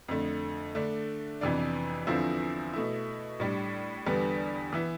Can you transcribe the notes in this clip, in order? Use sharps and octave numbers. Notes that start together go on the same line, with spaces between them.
F2 D3 A3
D3 A3 D4
F2 C3 E3 B3 D4
E2 D3 F3 C4 E4
B2 A3 E4
A2 G3 D4
E2 D3 G3 B3 D4
E3 B3 E4